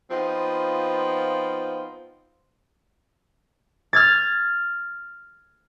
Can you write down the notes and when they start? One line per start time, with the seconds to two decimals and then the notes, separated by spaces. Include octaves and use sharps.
0.11 F3 B3 C4 D#4 F4
3.93 F6 G#6 A6